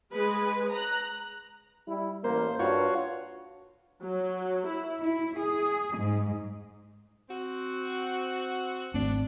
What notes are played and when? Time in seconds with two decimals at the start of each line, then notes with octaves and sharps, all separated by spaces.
0.13 G#3 B4
0.72 A#5 F#6
1.88 G3 E4
2.24 A1 A#3 A#4 C5
2.60 G2 F4 F#4 C#5
4.01 F#3
4.66 E4
5.00 E4
5.38 G#4
5.97 G#2
7.29 C4 F#4
8.94 G#1 A3 C4 D4